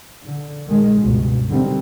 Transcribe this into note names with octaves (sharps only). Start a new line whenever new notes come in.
D3
A#2 D#3 G#3
C#2 G2 B2
D3 D#3 G3 C4